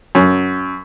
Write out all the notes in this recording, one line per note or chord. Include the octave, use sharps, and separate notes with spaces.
F#2